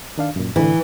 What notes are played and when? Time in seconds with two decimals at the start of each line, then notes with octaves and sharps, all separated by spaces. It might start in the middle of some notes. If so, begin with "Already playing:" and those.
0.18 D#3 D4 F5
0.36 F#2 A#2
0.56 C2 A2 D3 E3